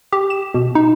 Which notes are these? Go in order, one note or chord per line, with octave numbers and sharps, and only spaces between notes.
G4
E7
B2
D#4